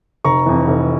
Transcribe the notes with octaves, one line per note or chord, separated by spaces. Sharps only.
F1 A#5 C#6
F2 E3
F1